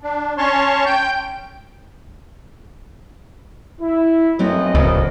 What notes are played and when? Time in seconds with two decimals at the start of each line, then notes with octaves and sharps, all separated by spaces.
0.01 D4
0.38 C#4 C#5 A5 C6 C#6
0.86 G5 G6
3.81 E4
4.39 B1 F#2 F#3 A3 C4 D#5
4.75 D1 C#2 F3 C#5 D5